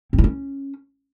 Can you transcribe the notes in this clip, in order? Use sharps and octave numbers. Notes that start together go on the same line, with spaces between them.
C4
E4
C#4